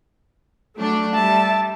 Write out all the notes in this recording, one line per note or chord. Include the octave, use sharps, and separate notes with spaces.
F#3 A3 D4
G3 E5 A5